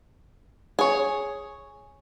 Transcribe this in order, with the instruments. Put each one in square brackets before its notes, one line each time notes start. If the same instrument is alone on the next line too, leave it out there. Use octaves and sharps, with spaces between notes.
[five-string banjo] G#4 C#5